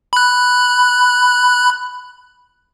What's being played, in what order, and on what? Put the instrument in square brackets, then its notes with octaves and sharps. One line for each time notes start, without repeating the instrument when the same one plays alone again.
[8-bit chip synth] B5 F#6